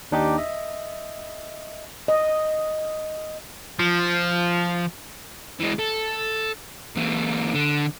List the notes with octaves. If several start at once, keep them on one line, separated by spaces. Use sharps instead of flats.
D#2 D4 D#4 G4 D6
D#5 E5
D#5
F3
E3 G#3
A4
A#2 E3
D3